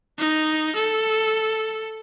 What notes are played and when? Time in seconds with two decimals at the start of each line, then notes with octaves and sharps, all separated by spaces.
0.18 D#4
0.75 A4